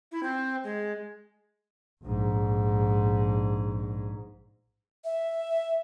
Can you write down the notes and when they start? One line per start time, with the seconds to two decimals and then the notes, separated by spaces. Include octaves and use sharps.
0.12 E4
0.23 C4
0.64 G#3
2.03 A#1 G#2
5.04 E5